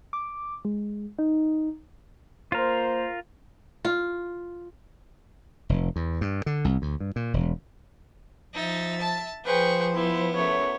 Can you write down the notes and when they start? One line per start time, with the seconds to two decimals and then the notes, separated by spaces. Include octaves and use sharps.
0.13 D6
0.65 G#3
1.19 D#4
2.52 A#3 F4 A#4 C5
3.85 F4
5.69 F1
5.96 E2
6.21 G2
6.46 D3
6.65 C2
6.82 D2
7.00 G2
7.16 A#2
7.34 E1
8.54 F3 D#4 E5 A6
9.01 A5
9.44 F3 G#4 B4 C5 G5 C#6
9.94 B3 E4
10.35 F#2 A3 C#5